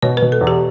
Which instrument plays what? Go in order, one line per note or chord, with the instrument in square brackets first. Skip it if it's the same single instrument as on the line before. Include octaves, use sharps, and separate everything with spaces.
[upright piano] B2 [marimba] C#5
[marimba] B4
[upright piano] B2
[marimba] A4
[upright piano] E2
[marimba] G4